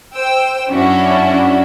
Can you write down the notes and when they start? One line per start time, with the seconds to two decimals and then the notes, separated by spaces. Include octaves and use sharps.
0.14 C5 G5 E6
0.70 F#2 C#4 D4 E4 F#4